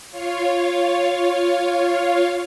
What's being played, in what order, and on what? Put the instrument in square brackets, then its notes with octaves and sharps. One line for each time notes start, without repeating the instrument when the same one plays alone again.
[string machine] F4 C#5 F5